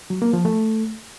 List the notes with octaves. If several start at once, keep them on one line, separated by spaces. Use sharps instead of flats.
F#3
A#3
F3
A3